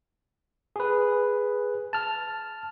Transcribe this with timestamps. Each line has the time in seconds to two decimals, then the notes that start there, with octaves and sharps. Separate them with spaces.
0.76 G#4 B4
1.93 A5 F6